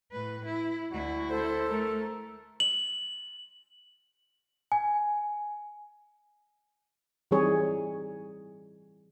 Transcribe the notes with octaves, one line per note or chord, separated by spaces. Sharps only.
A2 B4
E4
D2 E4 F#4
A4 C5
A3 A#4
F#7
G#5
E3 G3 C4 D#4 G#4 C#5